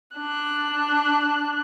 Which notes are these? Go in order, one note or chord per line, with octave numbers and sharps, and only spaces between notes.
D4 F#6